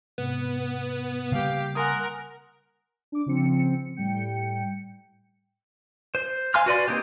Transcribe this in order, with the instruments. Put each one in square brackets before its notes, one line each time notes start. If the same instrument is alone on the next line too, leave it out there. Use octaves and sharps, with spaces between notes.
[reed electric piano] G#2 C3 [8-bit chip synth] B3
[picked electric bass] C#3 G3 A#3 [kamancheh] G4 F5
[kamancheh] A#4 F#5 [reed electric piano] G#5 C6 D#6
[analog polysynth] D4 D6
C#3 F3 C4 C#7
A2 G3 G5 C#7
[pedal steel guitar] C5
F5 G#5 C6 F6
F#4 B4 D5 C6
A#3 C4 D#4 G4